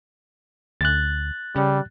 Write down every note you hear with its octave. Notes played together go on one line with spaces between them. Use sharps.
D2 F#6 A6
C#3 G3